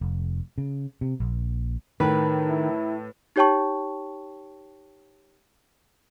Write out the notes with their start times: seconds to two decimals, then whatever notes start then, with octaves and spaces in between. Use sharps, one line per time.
0.01 F1
0.58 C#3
1.01 C3
1.20 A#1
2.00 A2 D#3 B4
2.48 E4
3.36 D#4 G4 C#5 G5 A5 C#6